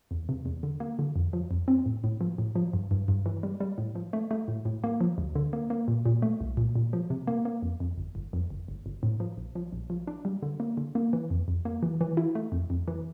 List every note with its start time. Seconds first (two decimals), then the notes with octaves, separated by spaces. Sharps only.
0.11 E2
0.29 C3
0.45 E2
0.63 D3
0.80 A#3
0.99 D3
1.16 F2
1.33 F3
1.51 F2
1.68 C4
1.86 A2
2.04 A2
2.21 F3
2.38 A2
2.55 F3
2.73 G2
2.91 G2
3.08 G2
3.26 E3
3.43 G3
3.60 G3
3.78 A2
3.95 F3
4.13 A3
4.31 A3
4.48 A2
4.65 A2
4.84 A#3
5.01 F3
5.18 D2
5.35 D3
5.53 A#3
5.70 A#3
5.88 A#2
6.06 A#2
6.22 A3
6.41 C2
6.57 A#2
6.76 A#2
6.93 F3
7.10 C3
7.27 A#3
7.45 A#3
7.62 F2
7.80 F2
7.97 G1
8.15 G1
8.33 F2
8.50 G1
8.68 G1
8.86 G1
9.03 A2
9.20 F3
9.37 A#1
9.55 F3
9.72 A#1
9.90 F3
10.07 D4
10.25 G3
10.42 D3
10.60 A#3
10.77 D3
10.95 A#3
11.13 E3
11.30 F2
11.48 F2
11.65 A#3
11.83 E3
12.01 E3
12.17 E4
12.35 A3
12.52 F2
12.70 F2
12.88 E3